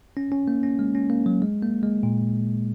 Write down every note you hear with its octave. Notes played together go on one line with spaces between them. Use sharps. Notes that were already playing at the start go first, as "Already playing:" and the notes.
C#4
C#4
A#3
C#4
G#3
C#4
A#3
F#3
G#3
A#3
G#3
A#2